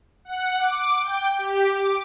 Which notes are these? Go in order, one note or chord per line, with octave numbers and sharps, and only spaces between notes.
F#5
D6
G5
G4
D6